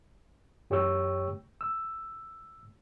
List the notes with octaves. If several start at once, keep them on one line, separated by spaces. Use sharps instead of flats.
F#2 G4 C#5 G5 C#6 E6
E6